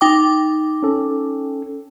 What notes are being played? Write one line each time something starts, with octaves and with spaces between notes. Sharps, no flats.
D#4 G5 D6
C#4 A4